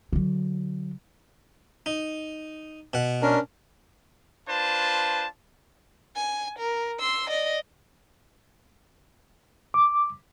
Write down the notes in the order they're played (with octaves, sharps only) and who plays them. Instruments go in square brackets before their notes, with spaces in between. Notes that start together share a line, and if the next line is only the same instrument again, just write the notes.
[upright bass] D3 F#3
[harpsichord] D#4
B2 F#5
[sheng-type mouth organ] C#4 D4 A#4
[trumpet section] D4 F4 B4 C5 A5
[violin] G#5
A#4
C6 E6
D5 D#5
[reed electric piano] D6